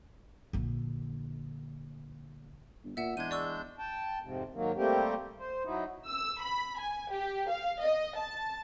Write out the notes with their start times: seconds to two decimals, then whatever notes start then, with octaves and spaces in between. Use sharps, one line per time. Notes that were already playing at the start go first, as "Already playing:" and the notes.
0.53 A#1 D3
2.84 G1
2.97 A#2 E5 F#5 E6
3.17 E2 G#3 D4 G6 G#6 D#7
3.31 D5 C#6 E6
3.79 G5 A5
4.22 F2 G#2 C3
4.54 G#2 D#3 F#3 A#3
4.76 G3 A3 A#3 C4 G4
5.39 C5
5.65 F#3 D#4 E4
6.08 E6
6.41 B5
6.79 G#5
7.11 G4
7.49 F5
7.81 D#5
8.17 A5